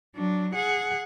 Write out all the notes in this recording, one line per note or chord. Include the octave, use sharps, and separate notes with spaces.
F#3 D4
G#4 F#5